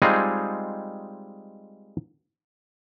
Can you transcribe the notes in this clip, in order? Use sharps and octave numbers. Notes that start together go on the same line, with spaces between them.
G3 G#3 C4 D#4 F4 G#4